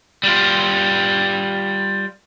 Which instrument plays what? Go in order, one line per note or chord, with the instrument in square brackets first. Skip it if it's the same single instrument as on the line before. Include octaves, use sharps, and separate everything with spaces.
[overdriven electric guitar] G3 F4